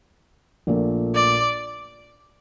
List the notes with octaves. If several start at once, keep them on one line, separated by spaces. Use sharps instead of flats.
A#1 A#2 A3
D5